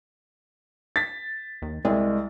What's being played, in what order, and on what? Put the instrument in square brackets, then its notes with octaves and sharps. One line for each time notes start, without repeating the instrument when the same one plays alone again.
[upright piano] A6 B6
[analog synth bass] D#2
[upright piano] C2 [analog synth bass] G#3